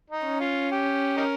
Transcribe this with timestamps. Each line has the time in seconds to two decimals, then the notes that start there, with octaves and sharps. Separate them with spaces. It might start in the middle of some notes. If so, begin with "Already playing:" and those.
0.10 D#4
0.26 C#4
0.40 F4
0.72 G4
1.17 D#4 G4 A#4